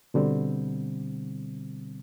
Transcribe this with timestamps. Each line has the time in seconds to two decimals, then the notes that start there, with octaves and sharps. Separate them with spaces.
0.14 B2 D3 G3 C4